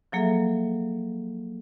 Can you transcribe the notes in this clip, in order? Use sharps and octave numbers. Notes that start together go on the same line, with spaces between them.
F3 F#3 A#3 G#4 A4 E5